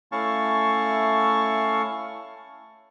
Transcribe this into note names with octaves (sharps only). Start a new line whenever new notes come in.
A3 C#4 E4 F5 A5 C#6